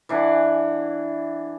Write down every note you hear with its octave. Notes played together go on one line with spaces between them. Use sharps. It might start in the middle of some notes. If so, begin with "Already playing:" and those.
E3 D4 F#5 G#5